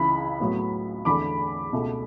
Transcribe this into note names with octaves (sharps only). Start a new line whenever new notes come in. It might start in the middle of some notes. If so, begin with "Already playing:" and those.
Already playing: C#2 C#3 E3 B5
A2 F#3 B3
E2 D3 A3 B5 D6
C#2 B2 A3